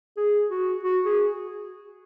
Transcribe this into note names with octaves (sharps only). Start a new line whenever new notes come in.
G#4
F#4
F#4
G#4